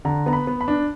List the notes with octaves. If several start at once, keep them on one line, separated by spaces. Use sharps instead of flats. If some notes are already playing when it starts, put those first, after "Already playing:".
D3 A#5
B3 A#5
B5
B3
B5
D4